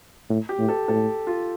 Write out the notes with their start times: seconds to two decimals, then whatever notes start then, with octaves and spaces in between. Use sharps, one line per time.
0.29 A2
0.49 G4
0.58 A2
0.68 A4
0.88 A2 A4
1.27 F4